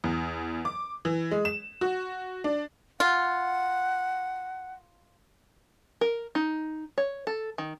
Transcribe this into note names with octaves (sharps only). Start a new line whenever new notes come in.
E2
D6
E3
G#3
E7
F#4
D4
F4 F#5
A#4
D#4
C#5
A4
D#3